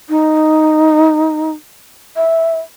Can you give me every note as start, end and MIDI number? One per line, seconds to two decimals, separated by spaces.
0.09 1.51 63
2.16 2.59 76